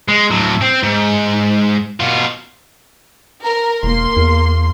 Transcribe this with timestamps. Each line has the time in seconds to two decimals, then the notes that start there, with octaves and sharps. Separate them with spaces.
0.08 G#3
0.31 A2 F#3
0.62 C4
0.83 G#2
2.00 B2 F4
3.44 A#4
3.83 E1 A#3 C6
4.17 E2